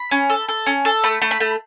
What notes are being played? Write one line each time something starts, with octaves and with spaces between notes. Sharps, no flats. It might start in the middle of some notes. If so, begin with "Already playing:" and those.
Already playing: B5
C#4
A4
A4
C#4
A4
A3 B5
A3
B5
A3